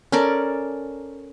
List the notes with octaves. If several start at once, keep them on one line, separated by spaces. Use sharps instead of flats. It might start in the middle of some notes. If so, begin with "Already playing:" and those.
C#4 A4 A#4 D5